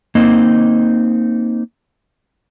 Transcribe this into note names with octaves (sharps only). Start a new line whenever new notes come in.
A#3 C4 D#4 D#5